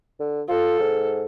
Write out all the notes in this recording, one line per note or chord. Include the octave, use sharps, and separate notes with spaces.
D3
F4 A4
G#2